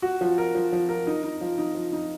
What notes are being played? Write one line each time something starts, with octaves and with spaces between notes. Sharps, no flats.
F#4
F3
A#4
F3
F3
A#4
D#4
D#4
F3
D#4
F3
D#4